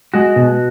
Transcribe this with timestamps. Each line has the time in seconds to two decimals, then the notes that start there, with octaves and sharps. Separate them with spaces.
0.14 G#3 F#4
0.36 B2